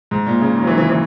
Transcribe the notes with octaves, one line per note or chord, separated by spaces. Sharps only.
G#2
A#2
C#3
D#3
F#3
E3
E3
E3